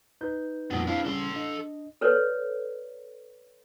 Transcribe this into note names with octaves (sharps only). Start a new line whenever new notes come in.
D#4 B4 G6
F2 A#2 G3 B3 D#4
C4 D4 E4 B4 F5
C#3 G3 C#4 A4 C6
D4 D#5
A4 B4 C#5 D5